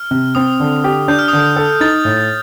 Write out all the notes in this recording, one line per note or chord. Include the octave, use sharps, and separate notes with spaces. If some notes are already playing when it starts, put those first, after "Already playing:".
Already playing: F6
C3
C4 D#6
D3
G4
D4 G6
F6
D3 D#6
F6
A4
D#4 A6
A2